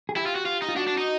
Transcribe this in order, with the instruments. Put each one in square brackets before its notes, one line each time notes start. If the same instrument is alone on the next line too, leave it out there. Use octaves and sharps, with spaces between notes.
[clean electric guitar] G#4
[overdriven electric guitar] E4 [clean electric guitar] G4
[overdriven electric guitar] F4
F#4
F4
D#4
[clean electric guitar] F4
[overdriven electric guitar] D4 [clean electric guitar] F#4
[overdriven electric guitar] D4
D#4